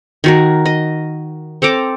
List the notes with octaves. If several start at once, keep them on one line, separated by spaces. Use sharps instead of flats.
D#3 F#4 A#4
D#5
C4 A4 A#5 D6